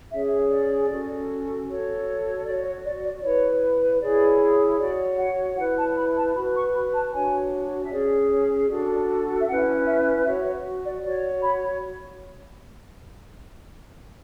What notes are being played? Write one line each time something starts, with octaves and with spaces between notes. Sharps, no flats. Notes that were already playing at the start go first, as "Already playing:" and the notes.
C#4 G#4 C#5 E5
D5
C#4 F#4 A4
F#4 A4 C#5
F#4 C#5 D5
C#5
D5
D5
E4 B4 C#5
E4 G#4 C#5 D5
F#4 C#5 D5
F#5
E4 B4 F#5
A5
B5
A5
F#4 B4 B5
C#6
B5
A5
D4 F#4 C#5 G#5
E5
C#4 G#4 C#5 D5
C#5
D4 F#4 A4 D5
E5
C#4 E4 B4 F#5
E5
F#4 C#5 E5
C#5
D5
F#4 C#5 D5
B5